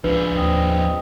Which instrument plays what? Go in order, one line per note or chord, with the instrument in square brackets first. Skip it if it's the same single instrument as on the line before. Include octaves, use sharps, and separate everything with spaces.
[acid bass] C#2 [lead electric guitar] F3 G#4 [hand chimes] D4 B4
[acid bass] D#2 [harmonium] C4 D#5